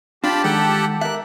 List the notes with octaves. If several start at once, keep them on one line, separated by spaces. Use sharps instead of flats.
D4 F4 G4 D5 A5 B5
D#3 G#3 A4 F#5 G5
A#4 E5 F#6